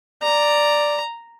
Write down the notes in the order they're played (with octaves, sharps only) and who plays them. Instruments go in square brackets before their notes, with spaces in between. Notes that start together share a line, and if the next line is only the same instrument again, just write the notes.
[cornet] D5 [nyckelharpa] A#5